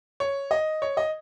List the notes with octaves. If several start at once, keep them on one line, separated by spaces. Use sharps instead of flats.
C#5
D#5
C#5
D#5